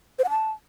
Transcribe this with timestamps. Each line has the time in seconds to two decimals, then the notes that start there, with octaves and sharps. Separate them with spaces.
0.19 C5
0.24 F#5
0.30 A5